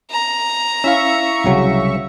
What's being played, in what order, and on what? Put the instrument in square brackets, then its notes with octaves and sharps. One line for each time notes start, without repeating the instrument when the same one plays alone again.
[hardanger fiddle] A#5
[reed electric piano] C#4 E4 F5 [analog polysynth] E5 C#6
[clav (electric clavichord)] C2 C#3 F#3